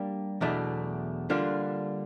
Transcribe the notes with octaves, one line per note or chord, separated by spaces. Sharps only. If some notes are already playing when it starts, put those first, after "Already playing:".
Already playing: G3 A#3 D4 G4
E2 B2 F#3 A3 D4
D3 G3 A#3 D4 F4